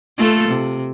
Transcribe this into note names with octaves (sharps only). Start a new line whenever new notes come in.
A3 F4 A4
C3